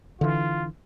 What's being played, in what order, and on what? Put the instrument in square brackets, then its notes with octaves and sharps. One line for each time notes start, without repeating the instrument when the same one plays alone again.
[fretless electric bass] D3 E3 [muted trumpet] F4